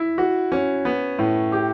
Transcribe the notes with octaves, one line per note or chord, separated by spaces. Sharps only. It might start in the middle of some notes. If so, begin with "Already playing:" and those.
Already playing: E4
F#4
C#4
B3
A2
G4